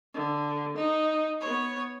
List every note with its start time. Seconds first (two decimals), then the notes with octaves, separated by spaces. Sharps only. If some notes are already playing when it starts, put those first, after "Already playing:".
0.14 D3
0.77 D#4
1.41 B3 C#5